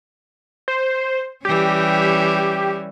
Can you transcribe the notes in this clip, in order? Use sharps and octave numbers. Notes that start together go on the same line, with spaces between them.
C5
E3 G3 C#4 G4